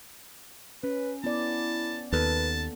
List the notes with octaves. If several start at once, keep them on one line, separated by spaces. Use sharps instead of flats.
C#4 B4
B3 E4 D5 A5
D#2 A#3 B3 A4 B4 A5